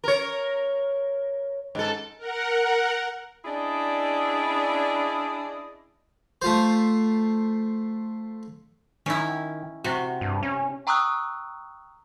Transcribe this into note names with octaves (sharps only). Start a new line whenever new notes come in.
A#4 C#5
G#2 A4
A#4 F#5
C#4 D4 E4 G#4 D5 D#5
A3 F4 C5
D#3 C#4 E4
C3 F#4
G2
C#4
G5 A#5 C#6 D#6 E6 F#6